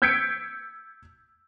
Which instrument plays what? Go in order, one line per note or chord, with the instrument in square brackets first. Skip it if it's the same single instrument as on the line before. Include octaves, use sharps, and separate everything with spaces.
[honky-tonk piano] E6 G6 G#6 B6 C#7 D7